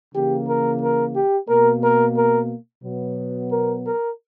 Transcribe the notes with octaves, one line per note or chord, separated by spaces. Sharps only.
C#3 E3 A#3 G4
A#4
A#4
G4
B2 A#3 A#4
A#4
A#4
B2 F#3 B3
A#4
A#4